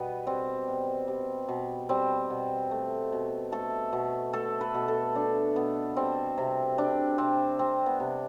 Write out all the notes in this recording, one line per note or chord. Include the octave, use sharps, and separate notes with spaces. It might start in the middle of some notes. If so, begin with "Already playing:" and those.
Already playing: B2 G3 B3
G3 C4
B2
G3
B2
G3 C4
B2
A3
B2
A3 A4
B2
A3 A4
B4
B2
A4
A3 D4
B2 B3
G3 C4
C3
G3 D4
C3 C4
G3 C4
B3
C3